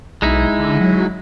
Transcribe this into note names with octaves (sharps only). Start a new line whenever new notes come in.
B1 G#3 D#4 E4
D3
F#3